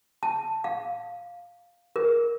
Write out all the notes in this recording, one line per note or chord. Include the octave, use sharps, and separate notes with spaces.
A5
F5
A#4